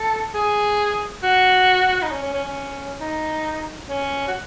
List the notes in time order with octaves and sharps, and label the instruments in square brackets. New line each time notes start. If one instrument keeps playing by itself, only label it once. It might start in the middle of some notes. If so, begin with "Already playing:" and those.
Already playing: [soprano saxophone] A4
G#4
F#4
D#4
C#4
C#4
C#4
C#4
D#4
C#4
F#4